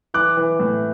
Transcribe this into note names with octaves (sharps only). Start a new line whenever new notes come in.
E3 D6 F#6
E3
A2